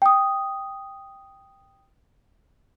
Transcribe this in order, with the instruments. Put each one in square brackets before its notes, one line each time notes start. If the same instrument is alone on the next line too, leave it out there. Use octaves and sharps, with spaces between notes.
[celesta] G5 D#6